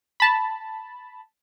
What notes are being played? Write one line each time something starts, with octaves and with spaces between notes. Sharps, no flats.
A5 B5